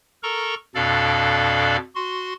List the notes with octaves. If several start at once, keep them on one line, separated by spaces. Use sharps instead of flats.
A4 A#4 A#5 C#6
F2 B2 D4 A4 D5 F5
F#4 C6